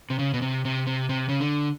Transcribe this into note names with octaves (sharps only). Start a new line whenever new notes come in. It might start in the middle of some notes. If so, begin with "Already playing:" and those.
C3
C#3
B2
C3
C3
C3
C3
C#3
D3